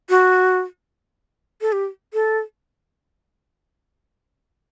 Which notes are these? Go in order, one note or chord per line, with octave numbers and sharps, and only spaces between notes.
F#4
A4
G4
A4